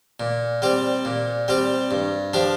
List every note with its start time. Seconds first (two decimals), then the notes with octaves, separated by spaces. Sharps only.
0.20 A#2
0.62 G3 C4 G4
1.05 A#2
1.48 G3 C4 G4
1.91 G2
2.34 F3 D4 G4